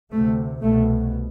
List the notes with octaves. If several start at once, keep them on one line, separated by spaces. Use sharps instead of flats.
D2 C3 A3
C2 B2 A3